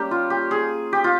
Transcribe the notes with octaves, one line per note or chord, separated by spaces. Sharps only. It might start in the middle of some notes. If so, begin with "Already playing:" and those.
Already playing: G3 A#3 C#4 G4
F4
G4
G#4
G4
F4